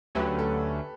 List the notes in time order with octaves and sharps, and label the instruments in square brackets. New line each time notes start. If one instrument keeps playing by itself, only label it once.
[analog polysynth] D2 D3 F#3 A3 C#4 [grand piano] G4 B4
[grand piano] A4